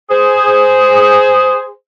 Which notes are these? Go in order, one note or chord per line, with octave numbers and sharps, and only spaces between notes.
G#4 C5